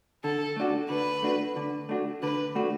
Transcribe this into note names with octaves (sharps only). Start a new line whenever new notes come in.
D3 A4
A3 D4 F#4
D3 B4
A3 D4 F#4
D3
A3 D4 F#4
D3 B4
A3 D4 F#4